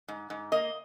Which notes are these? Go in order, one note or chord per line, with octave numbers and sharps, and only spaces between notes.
G#2
G#2
A#3 D#5